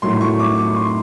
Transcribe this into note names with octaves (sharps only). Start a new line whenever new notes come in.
A2 F#3 A3 C6
C#6
D6
C#6
C6